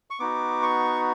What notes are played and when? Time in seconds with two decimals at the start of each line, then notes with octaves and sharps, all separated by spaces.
0.10 C#6
0.20 B3 D#4 F#4 D6
0.62 C#6